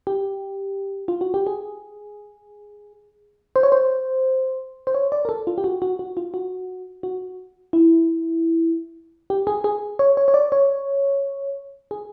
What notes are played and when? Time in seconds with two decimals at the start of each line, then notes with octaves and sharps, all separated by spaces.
0.07 G4
1.08 F4
1.21 F#4
1.34 G4
1.47 G#4
3.56 C5
3.63 C#5
3.72 C5
4.87 C5
4.95 C#5
5.12 D5
5.25 A#4
5.29 A4
5.47 F4
5.58 G4
5.64 F#4
5.82 F#4
5.99 F#4
6.17 F4
6.34 F#4
7.03 F#4
7.73 E4
9.30 G4
9.47 G#4
9.64 G#4
9.99 C#5
10.17 C#5
10.28 C#5
10.34 D5
10.52 C#5
11.91 G#4